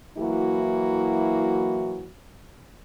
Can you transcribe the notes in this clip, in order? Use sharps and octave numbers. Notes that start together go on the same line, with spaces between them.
E3 F#3 A#3 E4 F#4